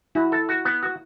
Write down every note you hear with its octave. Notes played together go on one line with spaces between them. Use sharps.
E4 F#4
A4
F#4
B3
F#4